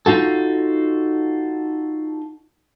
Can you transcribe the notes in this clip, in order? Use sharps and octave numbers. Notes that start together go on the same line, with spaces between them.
D#4 F4 F#4 A4